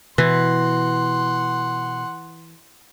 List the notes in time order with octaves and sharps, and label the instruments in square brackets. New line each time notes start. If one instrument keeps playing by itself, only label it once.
[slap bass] B2 [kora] E3 [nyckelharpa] F#5 C6